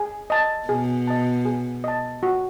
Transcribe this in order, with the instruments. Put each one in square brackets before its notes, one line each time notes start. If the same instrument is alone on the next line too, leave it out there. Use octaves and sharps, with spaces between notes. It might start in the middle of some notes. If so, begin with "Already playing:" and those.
Already playing: [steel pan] G#4
D#5 A5
[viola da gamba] B2 [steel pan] G#4
[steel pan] D#5 A5
G#4
D#5 A5
F#4